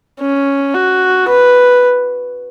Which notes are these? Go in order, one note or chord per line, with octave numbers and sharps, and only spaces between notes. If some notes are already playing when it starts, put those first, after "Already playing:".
C#4
F#4
B4